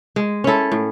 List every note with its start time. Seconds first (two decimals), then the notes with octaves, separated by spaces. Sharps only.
0.16 G#3
0.44 C#4 E4 A4
0.72 A2